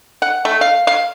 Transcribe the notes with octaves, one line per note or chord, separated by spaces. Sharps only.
F#5
A3
F5
F5